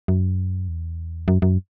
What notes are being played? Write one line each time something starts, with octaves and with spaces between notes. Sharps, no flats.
F#2
E2
F#2
F#2